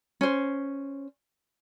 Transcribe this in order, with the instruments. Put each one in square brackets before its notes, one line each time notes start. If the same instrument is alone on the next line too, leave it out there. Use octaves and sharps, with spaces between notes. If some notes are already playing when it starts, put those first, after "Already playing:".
[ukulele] C#4 C5